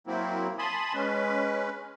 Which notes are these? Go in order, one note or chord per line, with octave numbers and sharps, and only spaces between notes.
F#3 A#3 C4 E4
G#5 A5 B5 C6 D#6
G#3 C#4 B4